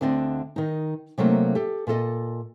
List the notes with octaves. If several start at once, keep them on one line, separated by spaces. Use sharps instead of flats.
D2 D3 C4 D5 D#5
D#3 D#4
C3 F#3 A3 A#3 D#4
G4 A4
A#2 F4 A4 D#5